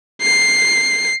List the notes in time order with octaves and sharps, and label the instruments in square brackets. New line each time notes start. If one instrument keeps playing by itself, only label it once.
[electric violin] C7